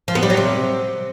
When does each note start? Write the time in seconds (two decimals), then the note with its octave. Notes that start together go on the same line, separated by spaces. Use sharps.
0.08 F3
0.15 B3
0.23 G3
0.30 F#3
0.37 C3